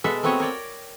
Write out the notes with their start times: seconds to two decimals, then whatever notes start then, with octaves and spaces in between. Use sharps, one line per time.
0.04 B2 G#3 A4 B4 E5 F#5
0.23 A3 B3 C4 F#4 C#5 D#5
0.40 A#4 C#5 D5 G5